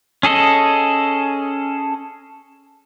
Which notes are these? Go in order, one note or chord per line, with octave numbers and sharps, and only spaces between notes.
C#4 G#4 A4 D#5